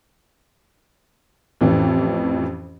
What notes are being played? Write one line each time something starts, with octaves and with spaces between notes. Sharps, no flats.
A1 F2 E3 C#4